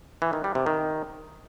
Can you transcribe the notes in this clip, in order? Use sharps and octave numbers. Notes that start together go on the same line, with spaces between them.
E3
D#3
G3
C3
D#3